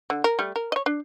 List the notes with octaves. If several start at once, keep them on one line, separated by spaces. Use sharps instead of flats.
D3
A#4
G3 A3
A#4
C#5 D#5
D4